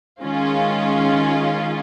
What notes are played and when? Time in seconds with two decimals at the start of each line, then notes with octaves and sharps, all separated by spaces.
0.22 D#3 G#3 C#4 F4